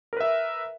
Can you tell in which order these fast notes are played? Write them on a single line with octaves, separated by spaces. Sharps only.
A#4 B4 E5